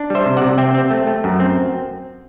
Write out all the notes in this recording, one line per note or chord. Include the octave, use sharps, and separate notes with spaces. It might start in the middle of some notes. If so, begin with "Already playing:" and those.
Already playing: D4
G3 C5 E5
C3
C3 D5 F#5
C4 E5 G5
C4
A3
A3
F#2
C4